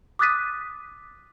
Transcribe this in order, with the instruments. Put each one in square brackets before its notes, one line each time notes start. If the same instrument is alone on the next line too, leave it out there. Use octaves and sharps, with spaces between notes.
[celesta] D6 D#6 F#6 A6 B6 D#7